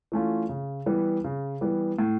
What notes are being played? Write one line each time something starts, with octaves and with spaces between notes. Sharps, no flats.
E3 A3 C#4 F4
C#3
E3 G3 B3
C#3
E3 G3 B3
A2